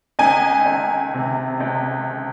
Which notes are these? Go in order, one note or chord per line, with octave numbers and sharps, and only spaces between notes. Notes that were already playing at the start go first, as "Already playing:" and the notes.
C#2 G#5
C#2
C3
C#2